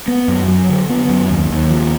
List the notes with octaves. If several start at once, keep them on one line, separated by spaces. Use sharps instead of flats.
B3
F#2
F#3
D3
B3
F#2
D#2
D#2
F3